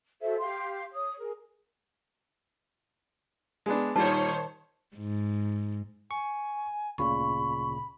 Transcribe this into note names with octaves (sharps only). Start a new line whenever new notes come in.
F#4 A4 C5 E5
G4 F5 C6
C#5 D#6
G#4 A#4
G#3 B3 D4
A#2 D#3 G3 C5 C#5 A5
G#2
G#5 C#6
D2 A#2 C#3 B5 C#6